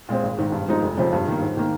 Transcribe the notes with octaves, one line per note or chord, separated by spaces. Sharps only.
A#2 G#3 C4
G#1
G#2 D#3
G2
F3 G#3 C4 D#4
F1
F2 C#3 F3 C4
G2
D#3 A#3
G#2
D#3 A#3